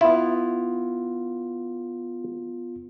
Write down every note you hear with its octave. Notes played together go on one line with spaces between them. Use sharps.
B3 E4 F4